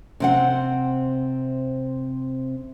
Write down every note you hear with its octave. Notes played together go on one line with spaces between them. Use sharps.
C3 C4 F#5